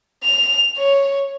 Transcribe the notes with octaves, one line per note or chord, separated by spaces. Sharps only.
F7
C#5